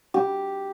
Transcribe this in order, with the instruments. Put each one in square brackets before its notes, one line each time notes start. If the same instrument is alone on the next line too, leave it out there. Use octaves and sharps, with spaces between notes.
[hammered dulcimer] G4